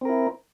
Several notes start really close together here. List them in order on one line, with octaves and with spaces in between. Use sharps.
C4 A#4 E4